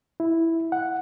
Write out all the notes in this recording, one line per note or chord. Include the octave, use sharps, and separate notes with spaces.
E4
F#5